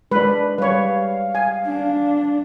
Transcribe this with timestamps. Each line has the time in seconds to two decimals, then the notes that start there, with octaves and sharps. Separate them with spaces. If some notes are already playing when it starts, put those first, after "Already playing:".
0.11 G#3 D4 B4 D5
0.58 G3 B4 C#5 F5
1.35 G#5
1.66 D4